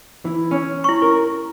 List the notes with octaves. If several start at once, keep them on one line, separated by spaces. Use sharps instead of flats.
E3
C#4
E4 C#6
A#4